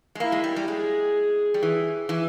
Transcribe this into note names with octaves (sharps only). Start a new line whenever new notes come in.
G#3
A#3 E4
G#3
G3
G3
G#3 G#4
G3
E3
E3